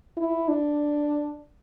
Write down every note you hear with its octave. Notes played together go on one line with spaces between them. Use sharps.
E4
D4